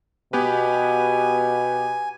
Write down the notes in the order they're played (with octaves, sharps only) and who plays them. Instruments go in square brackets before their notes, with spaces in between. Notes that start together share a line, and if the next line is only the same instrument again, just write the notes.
[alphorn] B2 [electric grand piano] B3 G4 B4 [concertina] G#5